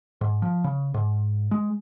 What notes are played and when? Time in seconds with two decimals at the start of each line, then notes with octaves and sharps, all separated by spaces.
0.21 G#2
0.42 F3
0.64 C#3
0.94 G#2
1.51 G#3